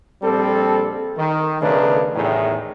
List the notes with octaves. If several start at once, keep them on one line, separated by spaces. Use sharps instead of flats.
A#1 G3 C4 A4
D#3
B1 C#3 A3 D4 A#4 B4
A1 E2 A2 D#3 E4 G#4